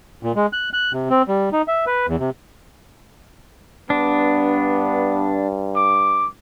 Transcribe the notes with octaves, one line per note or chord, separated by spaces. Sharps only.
A#2
G#3
F#6
F#6
C3
C4
G3
D#4
E5
B4
E2
C3
G2 B3 D4
D6